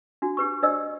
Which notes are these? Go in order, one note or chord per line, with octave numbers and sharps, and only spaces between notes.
D4 F#4
D4 G4 B4 C#6
D4 C5 D5 D#5 E6